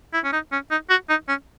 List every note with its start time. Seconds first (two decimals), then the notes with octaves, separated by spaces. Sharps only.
0.14 E4
0.24 C#4
0.33 D#4
0.52 C#4
0.71 D#4
0.90 F#4
1.09 D#4
1.28 C#4